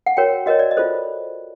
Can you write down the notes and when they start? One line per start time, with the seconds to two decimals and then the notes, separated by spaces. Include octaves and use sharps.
0.06 F#5
0.17 F#4 A#4 C#5 G5
0.46 F#4 A#4 C#5 D#5
0.59 D5
0.71 D#5
0.77 F4 A4 C5